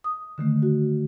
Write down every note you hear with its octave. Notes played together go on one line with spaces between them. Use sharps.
D#6
D3 D#3 A3
F#4